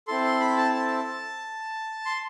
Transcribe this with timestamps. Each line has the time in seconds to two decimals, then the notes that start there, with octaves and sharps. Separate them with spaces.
0.07 C4 E4 A4 C6
0.24 C6
0.40 B5
0.57 A5
0.74 A5
2.06 C6